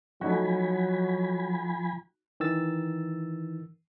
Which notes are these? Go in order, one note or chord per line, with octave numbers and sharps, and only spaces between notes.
F3 F#3 A3 D#4 F#4 G#5 B5
D#3 E3 E6 A6